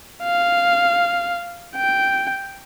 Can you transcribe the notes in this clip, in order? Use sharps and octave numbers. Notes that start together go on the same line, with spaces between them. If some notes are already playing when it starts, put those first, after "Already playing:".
F5
G5